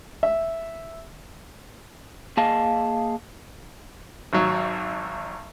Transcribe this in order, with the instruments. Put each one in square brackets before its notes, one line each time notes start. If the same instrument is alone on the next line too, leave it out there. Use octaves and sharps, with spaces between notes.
[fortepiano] E5
[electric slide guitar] A#3 G#4 D#5 F5 A5
[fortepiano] G#1 F#3